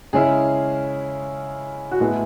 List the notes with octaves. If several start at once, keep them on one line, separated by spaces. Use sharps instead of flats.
C#3 G#3 C#4 E4 G#4
F#4
A2 G#3 B3 E4 G#4